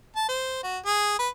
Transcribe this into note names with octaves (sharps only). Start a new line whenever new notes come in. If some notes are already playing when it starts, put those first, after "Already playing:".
A5
C5
F#4
G#4
B4